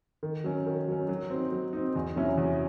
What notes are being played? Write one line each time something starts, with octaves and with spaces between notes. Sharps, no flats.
D#3
F#3 C#4
D#3
F#3 C#4
F#3
C4 D#4
F#3
C4 D#4
E2
C3 F#3 C#4 E4
E2